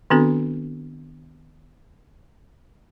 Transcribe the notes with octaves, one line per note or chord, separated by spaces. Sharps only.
D#3 B3 C4 D4 F#4 A4